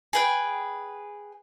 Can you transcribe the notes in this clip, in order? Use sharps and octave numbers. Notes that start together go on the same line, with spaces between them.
G#4 B4 G5